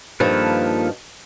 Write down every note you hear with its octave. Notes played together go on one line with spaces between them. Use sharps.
G2 D#3 F3 A#3 A4 B4